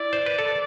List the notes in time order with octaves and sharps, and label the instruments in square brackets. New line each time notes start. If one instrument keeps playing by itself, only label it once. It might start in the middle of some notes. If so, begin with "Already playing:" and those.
Already playing: [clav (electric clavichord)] E4 [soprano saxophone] D5
[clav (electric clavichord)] C5
B4
A4